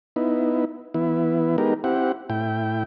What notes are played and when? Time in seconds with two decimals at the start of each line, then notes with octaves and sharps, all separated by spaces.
0.16 B3 D#4 E4
0.94 E3 B3 E4
1.58 G#3 B3 D#4 G4 A#4
1.84 C4 E4 G4 F#5
2.30 A2 E4 G5